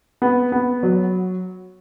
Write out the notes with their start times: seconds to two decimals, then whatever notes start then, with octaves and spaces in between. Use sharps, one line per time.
0.22 B3
0.52 B3
0.83 F#3